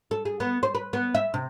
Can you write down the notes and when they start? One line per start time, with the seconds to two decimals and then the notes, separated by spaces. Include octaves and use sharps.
0.11 A4
0.25 G#4
0.40 B3
0.63 C5
0.75 B4
0.93 B3
1.15 E5
1.34 C3